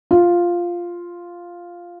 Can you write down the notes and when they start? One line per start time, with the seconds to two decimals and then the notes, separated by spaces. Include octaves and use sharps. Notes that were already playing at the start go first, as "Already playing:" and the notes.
0.11 F4